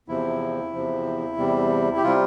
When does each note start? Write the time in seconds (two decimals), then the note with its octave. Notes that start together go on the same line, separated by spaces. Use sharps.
0.08 E2 C3 F3 E4
0.73 E2 C3 F3
1.37 E2 C3 G3
1.97 G4
2.03 C3 G3 F4